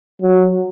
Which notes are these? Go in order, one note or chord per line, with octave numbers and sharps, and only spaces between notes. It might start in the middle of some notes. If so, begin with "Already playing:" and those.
F#3